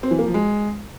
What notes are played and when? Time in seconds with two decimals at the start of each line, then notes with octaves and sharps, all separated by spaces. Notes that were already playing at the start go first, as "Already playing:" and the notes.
0.03 C4
0.11 E3
0.19 A#3
0.26 F3
0.34 G#3